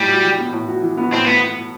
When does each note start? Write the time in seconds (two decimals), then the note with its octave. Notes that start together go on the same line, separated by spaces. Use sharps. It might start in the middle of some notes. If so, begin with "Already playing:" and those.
Already playing: A2 G3
0.09 F#4
0.23 E3
0.38 B3
0.53 A2
0.68 F#4
0.82 E3
0.97 B3
1.12 A2 C4
1.26 B3